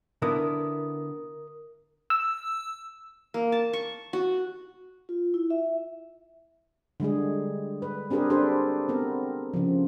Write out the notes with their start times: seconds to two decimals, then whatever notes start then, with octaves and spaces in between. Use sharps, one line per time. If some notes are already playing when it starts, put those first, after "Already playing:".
0.22 D3 B3 E4 A#4 D#6
2.10 E6
3.34 A#3
3.52 A5
3.73 C#6
4.13 F#4
5.09 F4
5.34 E4
5.50 E5
7.00 D3 G3 G#3 G#4
7.82 B4
8.11 C4 D4 G4 G#4 A#4 B4
8.30 D4 G4 A4 B4 C5
8.89 B3 C4 A#4
9.54 C#3 F3